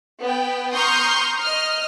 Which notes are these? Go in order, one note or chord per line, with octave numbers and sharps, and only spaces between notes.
B3 G5
A#5 C6 C#6 D#6 F6 G6
D#5 F6